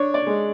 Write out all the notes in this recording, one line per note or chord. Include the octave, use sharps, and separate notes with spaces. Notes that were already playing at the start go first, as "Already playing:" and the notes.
Already playing: D4 C#5
D5
G#3